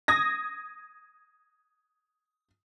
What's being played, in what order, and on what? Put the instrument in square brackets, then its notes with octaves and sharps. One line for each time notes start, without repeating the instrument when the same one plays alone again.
[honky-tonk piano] D#6 G#6 A#6